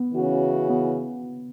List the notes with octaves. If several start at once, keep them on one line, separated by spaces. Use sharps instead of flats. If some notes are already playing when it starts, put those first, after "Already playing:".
Already playing: B3
C#3 E3 C#4 F#4
B3